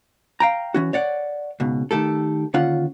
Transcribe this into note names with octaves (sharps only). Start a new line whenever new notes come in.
F5 G5 A#5
E3 C#4 F#4
C#5 D5 F#5
C#2 G#2 B2
D#3 A3 G4 A4
D#2 D3 C#4 F4 F#5